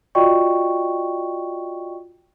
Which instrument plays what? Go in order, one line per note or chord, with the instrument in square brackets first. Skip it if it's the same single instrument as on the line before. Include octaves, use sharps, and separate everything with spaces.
[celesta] F4 F#4 D5 D#5 G5 C#6